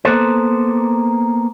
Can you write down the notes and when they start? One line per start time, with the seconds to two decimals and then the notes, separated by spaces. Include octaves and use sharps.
0.05 A#3 B3 A4 C5